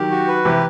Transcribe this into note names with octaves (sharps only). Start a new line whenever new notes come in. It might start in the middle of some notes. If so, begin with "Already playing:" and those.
Already playing: D#3 F#3 G4
F#4
B4
C3 E3 G4